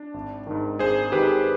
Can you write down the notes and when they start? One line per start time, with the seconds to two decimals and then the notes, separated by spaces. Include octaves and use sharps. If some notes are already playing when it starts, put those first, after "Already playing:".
Already playing: D4
0.14 G#1
0.47 G#2 D#3
0.79 G#1 G#4 C5
1.12 G#2 D#3 G4 B4